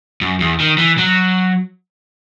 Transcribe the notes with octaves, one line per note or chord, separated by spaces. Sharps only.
F#2
E2
D#3
E3
F#3